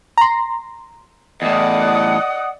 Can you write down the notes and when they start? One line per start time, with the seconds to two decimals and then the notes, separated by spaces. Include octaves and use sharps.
0.18 A#5 C6
1.42 E2 A2 D5 D#5 F#5 D#6